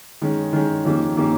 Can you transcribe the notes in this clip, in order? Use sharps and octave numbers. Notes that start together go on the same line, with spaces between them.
D#3 G#3 C#4
D#3 G#3 C#4
F2 D#3 A#3 C#4 G4
D#3 A#3 C#4 G4